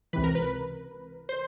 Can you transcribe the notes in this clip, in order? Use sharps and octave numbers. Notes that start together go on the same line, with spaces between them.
C#2 C3 E3 B4
A#4
B4
C5